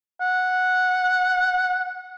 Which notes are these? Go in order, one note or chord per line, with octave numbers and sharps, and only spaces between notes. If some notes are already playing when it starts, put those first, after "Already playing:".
F#5